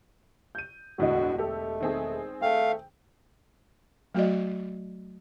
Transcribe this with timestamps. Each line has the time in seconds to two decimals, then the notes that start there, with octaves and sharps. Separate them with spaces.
0.55 G6 D#7
0.99 E1 D2 A2 D3 F#4 D#5
1.38 A3 G4 A4
1.81 D#3 C4 G#4
2.42 A3 F5 G5
4.14 F#3 A3 F#4 D5 D#5